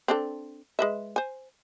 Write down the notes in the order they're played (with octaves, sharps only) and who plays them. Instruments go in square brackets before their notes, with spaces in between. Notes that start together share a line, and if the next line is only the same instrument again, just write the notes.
[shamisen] C4 D4 A4
G#3 B4 E5
C5 G#5